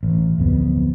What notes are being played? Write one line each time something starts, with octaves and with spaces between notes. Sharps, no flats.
A1
D1 F2 B3